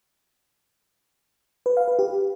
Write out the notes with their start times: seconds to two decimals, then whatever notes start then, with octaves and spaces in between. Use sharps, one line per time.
1.66 B4
1.77 F5
1.88 B4
1.99 G4